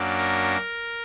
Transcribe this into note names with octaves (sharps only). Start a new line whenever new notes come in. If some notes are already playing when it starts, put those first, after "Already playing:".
Already playing: F#2 F#3 A#3 D4
A#4